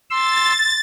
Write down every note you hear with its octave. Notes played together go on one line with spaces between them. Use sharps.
C6 E6 A6